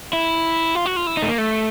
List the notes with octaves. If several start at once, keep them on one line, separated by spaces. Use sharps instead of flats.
E4
F4
F#4
F4
E4
D#4
A3
A#3
A3